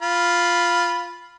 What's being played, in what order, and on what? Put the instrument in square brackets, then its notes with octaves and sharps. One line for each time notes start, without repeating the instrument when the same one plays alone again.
[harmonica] F4 B5